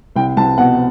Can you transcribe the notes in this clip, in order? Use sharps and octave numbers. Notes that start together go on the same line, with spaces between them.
C2 G5
C2 A5
B2 F#5